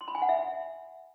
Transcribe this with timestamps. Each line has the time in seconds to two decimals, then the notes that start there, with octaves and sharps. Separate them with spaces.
0.01 C6
0.08 B5
0.15 G#5
0.22 F#5
0.29 E5